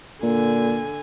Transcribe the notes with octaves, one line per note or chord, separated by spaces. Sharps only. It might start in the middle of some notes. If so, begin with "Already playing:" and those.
A#2 D3 G#5